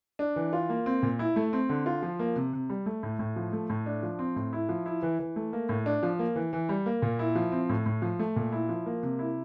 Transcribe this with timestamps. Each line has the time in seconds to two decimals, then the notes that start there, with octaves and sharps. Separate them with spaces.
0.19 D4
0.36 E3
0.53 F4
0.69 A#3
0.86 C4
1.03 A#2
1.19 E4
1.36 A3
1.53 C4
1.69 D3
1.86 F4
2.03 F3
2.19 A#3
2.36 C3
2.53 C3
2.69 G3
2.86 A3
3.03 A2
3.19 A2
3.36 F3
3.53 A3
3.69 A2
3.86 D4
4.03 F3
4.19 C4
4.36 A2
4.53 E4
4.69 F3
4.86 E4
5.03 E3
5.19 E3
5.36 A3
5.53 A#3
5.69 A2
5.86 D4
6.03 F3
6.19 A#3
6.36 E3
6.53 E3
6.69 G3
6.86 A#3
7.02 A#2
7.19 E4
7.35 F3
7.52 C4
7.69 A2
7.86 A2
8.02 F3
8.19 A3
8.36 A#2
8.52 E4
8.69 F3
8.86 A#3
9.03 C3
9.19 E4